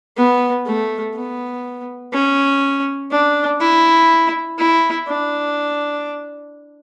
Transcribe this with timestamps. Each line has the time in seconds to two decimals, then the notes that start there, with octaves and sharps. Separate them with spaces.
0.17 B3
0.66 A3
1.14 B3
2.13 C#4
3.11 D4
3.60 E4
4.58 E4
5.07 D4